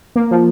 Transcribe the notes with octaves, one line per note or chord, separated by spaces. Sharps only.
A#3
F3